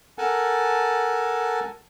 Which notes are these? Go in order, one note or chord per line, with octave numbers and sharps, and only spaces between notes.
A4 A#4 F#5 G#5 A5